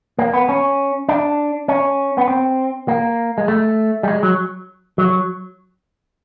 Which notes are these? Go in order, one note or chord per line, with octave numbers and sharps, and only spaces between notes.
A#3
B3
C#4
D4
C#4
B3
C4
A#3
G#3
A3
G3
G#3
F#3
F#3